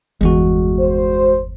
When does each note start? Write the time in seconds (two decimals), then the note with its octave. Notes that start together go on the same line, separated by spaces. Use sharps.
0.21 G1 E2 G#3 F#4
0.80 C5